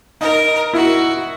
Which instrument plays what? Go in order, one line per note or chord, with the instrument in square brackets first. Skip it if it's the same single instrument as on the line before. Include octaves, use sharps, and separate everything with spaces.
[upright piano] D#4 [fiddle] A#4
[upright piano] E4 [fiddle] F#4